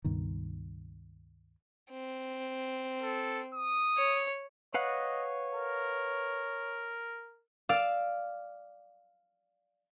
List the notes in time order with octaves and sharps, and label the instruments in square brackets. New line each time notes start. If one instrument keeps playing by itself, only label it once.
[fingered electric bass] C#2 G2 B2 D#3
[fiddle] C4
[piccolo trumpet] A4
D#6
[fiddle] C#5
[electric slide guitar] B4 F5 F#5 [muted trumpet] C#5 [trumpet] D#5
[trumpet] A#4
[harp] D5 F5 E6